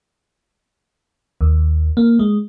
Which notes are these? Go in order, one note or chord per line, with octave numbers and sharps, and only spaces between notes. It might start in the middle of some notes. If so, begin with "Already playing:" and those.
D#2
A#3
G#3